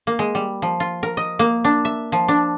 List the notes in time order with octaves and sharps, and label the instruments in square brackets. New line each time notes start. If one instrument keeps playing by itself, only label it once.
[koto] A#3
G#3
G3
F3
F4
A#4
D#5
A#3
D4
E5
F3
D4